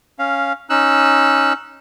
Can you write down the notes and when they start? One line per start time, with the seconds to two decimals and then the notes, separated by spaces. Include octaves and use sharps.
0.19 C#4 F5
0.70 C#4 D#4 E6 F#6